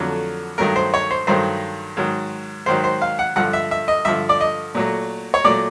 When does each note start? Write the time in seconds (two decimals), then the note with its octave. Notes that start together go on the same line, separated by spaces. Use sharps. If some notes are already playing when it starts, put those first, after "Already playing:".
Already playing: F2 D3 F#3 A3
0.58 G2 D#3 F#3 A3 A#4
0.76 C5
0.94 C#5
1.11 C5
1.27 G2 D#3 F#3 A3 C5
1.97 G#2 D#3 F#3
2.66 G#2 D#3 F#3 C5
2.84 C5
3.02 F5
3.19 F#5
3.36 G2 D3 F3 F#5
3.53 E5
3.71 E5
3.88 D#5
4.05 G2 D3 F3 E5
4.29 D5
4.41 D#5
4.75 A#2 F#3 A3
5.34 C#5
5.44 A#2 F#3 A3 D5